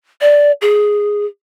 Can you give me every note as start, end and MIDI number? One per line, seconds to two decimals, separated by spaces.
0.21 0.52 74
0.62 1.25 68